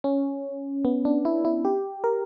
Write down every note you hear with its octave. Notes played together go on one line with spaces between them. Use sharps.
C#4
B3
D4
E4
E4
G4
A#4